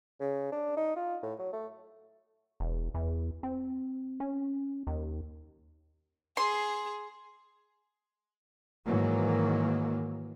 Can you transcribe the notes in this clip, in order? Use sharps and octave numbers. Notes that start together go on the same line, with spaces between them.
C#3
D4
D#4
F4
A2
F#3
A3
E1
E2
C4
C#4
D#2
G#4 C6
G#2 D#3 E3 F#3 A#3